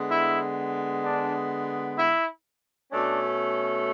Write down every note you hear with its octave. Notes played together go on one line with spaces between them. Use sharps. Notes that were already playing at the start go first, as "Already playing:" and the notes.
Already playing: D3 G#3 B3
E4
D4
E4
B2 A3 C#4 D4